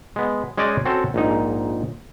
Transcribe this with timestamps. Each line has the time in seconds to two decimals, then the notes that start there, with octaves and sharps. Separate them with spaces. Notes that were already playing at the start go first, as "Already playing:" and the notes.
0.16 G#3 B3
0.57 G#3 C#4 C5 D5 D#5 G#5
0.85 C4 C#4 F#4 A4
1.14 A#1 G#2 D#4